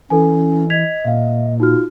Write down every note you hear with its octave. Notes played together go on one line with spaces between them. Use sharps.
E3 C#4 A4 B4 G#5
D#5 G#6 B6 F7
A#2 E5 F5
D#4 F4 F#4 F6